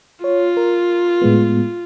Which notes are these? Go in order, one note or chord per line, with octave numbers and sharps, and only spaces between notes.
F4 C#5
A#4
A2 G#3 B3